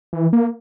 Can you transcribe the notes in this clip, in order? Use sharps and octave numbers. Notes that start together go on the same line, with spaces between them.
E3
A#3